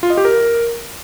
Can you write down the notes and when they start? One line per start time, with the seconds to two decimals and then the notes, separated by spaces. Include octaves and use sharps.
0.03 F4
0.10 D#5
0.17 G4
0.25 A#4